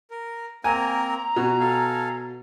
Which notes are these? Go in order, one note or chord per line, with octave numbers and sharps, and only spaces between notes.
A#4
A#3 C4 A#4 G#5 A#5
B2 F#4 G#5
A4 F5 G#5